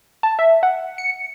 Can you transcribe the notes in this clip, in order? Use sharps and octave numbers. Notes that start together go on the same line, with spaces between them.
A5
E5
F#5
C#7